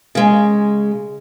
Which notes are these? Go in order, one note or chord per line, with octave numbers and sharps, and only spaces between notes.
C#3 G#3